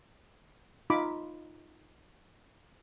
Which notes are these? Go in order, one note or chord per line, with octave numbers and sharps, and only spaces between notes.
D#4 F4 B5 D6